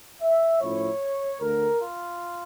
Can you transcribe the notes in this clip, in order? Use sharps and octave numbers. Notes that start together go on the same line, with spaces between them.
E5
A2 F3 C#4 E4 C#5
D2 D3 A3 A#4
F4